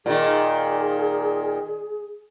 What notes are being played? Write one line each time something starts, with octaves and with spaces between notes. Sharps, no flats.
A#2 D#3 G#4